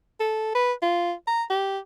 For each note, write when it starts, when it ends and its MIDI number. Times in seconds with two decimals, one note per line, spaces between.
0.20 0.51 69
0.55 0.73 71
0.82 1.13 65
1.27 1.43 82
1.50 1.78 67